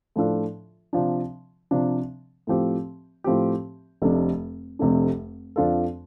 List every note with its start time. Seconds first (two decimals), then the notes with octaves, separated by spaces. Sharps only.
0.16 A2 F3 D4 F4 A4
0.93 C3 F3 D4
1.71 C3 F3 D4
2.47 A2 F3 C4 G4
3.24 A2 F3 C4 G4
4.02 F1 F2 C3 A3 D4
4.79 F1 F2 C3 A3 D4
5.56 F2 F3 D4 F4 A4